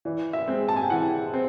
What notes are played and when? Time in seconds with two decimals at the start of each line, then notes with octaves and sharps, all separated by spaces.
0.05 E3 D5
0.33 E5
0.48 G#3 C4
0.68 A5
0.76 G#5
0.83 G5
0.90 E3 F#5
1.34 C4